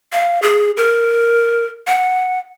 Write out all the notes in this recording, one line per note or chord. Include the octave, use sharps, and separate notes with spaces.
F5
G#4
A#4
F#5